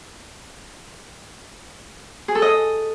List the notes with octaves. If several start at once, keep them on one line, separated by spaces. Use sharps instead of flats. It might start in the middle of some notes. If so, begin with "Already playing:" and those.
G#4
A4
D#5